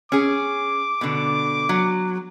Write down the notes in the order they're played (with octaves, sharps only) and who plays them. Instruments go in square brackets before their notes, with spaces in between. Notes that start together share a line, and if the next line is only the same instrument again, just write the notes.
[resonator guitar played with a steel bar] C#4 G#4 [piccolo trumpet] D6
[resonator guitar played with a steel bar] B2 D3
F#3